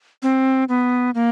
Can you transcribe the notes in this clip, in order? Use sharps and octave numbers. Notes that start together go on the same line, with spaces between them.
C4
B3
A#3